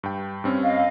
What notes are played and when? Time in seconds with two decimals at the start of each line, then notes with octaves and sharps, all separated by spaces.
0.03 G2 G5
0.44 G2 C4 C#4
0.63 D#5 F5